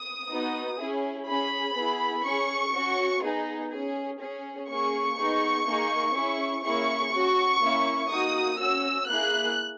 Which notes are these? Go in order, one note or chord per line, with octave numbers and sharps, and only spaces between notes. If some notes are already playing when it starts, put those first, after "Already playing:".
Already playing: D#6
B3 D#4 F#4
C#4 E4 G#4
C#4 G#4 B5
B3 E4 G#4
C#4 G#4 C#6
C#4 F#4
B3 D#4 G#4
C#4 G#4
C#4 G#4
A#3 C#4 G#4 C#6
B3 D#4 G#4
A#3 D#4 G#4
C#4 E4 G#4
A#3 C#4 E4 G#4 C#6
C#4 F#4
A#3 C#4 E4
A#3 D#4 F#4 D#6
C#4 F#4 E6
A#3 E4 G#4 F#6